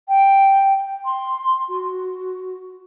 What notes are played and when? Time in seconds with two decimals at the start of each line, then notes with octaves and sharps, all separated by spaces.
0.08 G5
1.05 C6
1.68 F#4